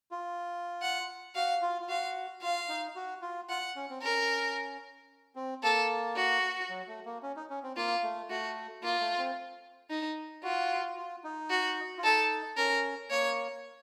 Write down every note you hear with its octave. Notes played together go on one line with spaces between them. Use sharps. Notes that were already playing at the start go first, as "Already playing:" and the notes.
F4
F#5
F#4 F5
F4
F4
F#4 F5
F4 F5
D#4
F#4
F4
F4 F#5
C#4
C4
C#4 A#4
C4
A#3 A4
F#4
F#3
A3
A#3
C#4
D#4
C#4
C4
A#3 F4
A3
A3 F#4
A#3 F4
A3
C4
D#4
F4 F#4
F4
D#4
F#4
F4
D#4 A4
C#4 A#4
A#3 C#5